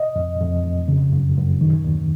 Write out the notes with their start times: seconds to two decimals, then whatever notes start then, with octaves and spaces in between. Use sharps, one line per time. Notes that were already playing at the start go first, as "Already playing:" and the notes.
Already playing: D#5
0.16 F2
0.40 F2
0.64 F2
0.88 C#3
1.13 F#2
1.37 F#2
1.61 D#3
1.84 D#2